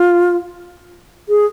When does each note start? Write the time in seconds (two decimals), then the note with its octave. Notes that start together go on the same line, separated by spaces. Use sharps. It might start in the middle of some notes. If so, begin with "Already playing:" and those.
Already playing: F4
1.29 G#4